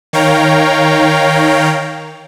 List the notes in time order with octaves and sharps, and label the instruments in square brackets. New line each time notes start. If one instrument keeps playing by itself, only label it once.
[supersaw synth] D#3 C#5 F5 G5 A#5